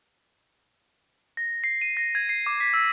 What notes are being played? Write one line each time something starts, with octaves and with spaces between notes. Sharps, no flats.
A#6
C7
D#7
A#6
G#6
C7
D6
B6
E6